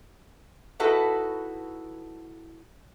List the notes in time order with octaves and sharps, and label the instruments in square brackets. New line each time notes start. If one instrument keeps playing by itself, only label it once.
[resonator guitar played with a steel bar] D#4 E4 F#4 A4 B4